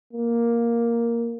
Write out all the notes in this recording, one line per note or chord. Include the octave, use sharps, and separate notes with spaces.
A#3